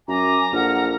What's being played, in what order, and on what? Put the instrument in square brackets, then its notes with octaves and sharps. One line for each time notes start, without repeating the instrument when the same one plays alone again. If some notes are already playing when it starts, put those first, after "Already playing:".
[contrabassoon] F#2 [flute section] G#5 D6 [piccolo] A#5
[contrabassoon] A#1 [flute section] A4 F#5 F6